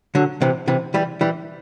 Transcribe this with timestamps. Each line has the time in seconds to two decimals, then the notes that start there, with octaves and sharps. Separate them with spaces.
0.15 D3 F#3
0.41 C3 E3
0.68 C3 E3
0.94 E3 G3
1.21 E3 G3